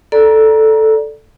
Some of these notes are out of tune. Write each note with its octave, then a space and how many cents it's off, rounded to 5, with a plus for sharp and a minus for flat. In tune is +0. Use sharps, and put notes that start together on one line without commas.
A4 +0 D5 +0 A#5 +25